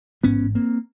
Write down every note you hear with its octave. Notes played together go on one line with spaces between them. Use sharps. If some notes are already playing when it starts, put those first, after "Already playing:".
A1 G#2 B3 C#4
A#3 C4